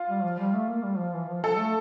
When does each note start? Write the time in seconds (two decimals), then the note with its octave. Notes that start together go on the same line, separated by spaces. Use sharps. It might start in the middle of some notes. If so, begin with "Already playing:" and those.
Already playing: F4
0.09 G3
0.23 F3
0.39 G3
0.54 A3
0.68 A#3
0.83 G3
0.98 F3
1.14 E3
1.29 F3
1.43 F3 A4
1.59 A3